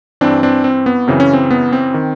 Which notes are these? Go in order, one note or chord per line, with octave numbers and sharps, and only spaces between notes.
G2 E3 C4 D4
C4 D4
C4
B3
F#2 C#3 E3 C4
C#4
C4
B3
C4
D#3